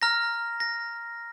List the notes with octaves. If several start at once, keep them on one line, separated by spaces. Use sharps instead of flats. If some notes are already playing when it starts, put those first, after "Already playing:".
A#5 F6 A#6
A#6